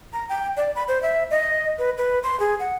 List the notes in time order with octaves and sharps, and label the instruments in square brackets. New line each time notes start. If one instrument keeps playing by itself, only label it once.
[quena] A#5
G5
D5
B5
C5
E5
D#5
B4
B4
C6
G#4
F#5